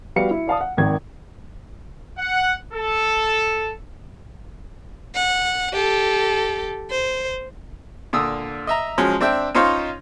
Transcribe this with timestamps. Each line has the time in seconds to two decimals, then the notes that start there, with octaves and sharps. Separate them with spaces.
0.16 G3 B3 F#4 F5 C#7
0.31 E4
0.47 D5 F5 A5 D#6
0.61 F#5
0.77 G#1 D#3 G#6
2.18 F#5
2.73 A4
5.15 F#5
5.73 G4 A4
6.90 C5
8.13 A#2 D3 D#6 E6
8.67 D#5 E5 A#5
8.98 F3 F#3 G#3 C#4
9.21 C4 D4 E5 G5
9.55 C#4 D#4 F4 C5 C#5 F5